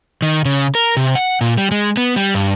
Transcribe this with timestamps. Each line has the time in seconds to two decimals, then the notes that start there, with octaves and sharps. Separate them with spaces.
0.22 D#3
0.45 C#3
0.75 A#4
0.97 C3
1.15 F#5
1.41 A#2
1.58 G3
1.72 G#3
1.97 B3
2.16 G3
2.35 G2